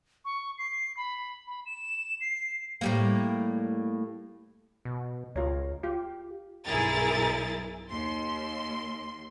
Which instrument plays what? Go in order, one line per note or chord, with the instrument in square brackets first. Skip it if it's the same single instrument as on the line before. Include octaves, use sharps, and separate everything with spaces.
[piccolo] C#6
C7
B5
B5
E7
C7
[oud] A2 G3 A#3
[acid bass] B2
[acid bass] C#2 [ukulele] F4 A#4 C#5
[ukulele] F4 [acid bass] G4
[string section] B1 G2 E4 G#4 A#4 A6
D#2 C6